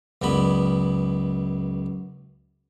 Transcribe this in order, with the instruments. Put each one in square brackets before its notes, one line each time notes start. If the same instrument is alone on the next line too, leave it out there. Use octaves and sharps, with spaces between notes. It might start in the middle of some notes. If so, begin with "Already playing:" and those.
[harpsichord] C#2 F#2 B3 D5 B5